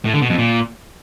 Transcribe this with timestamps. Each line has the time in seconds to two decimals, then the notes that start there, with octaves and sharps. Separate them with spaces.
0.05 A2
0.14 D3
0.22 B2
0.30 F2
0.38 A#2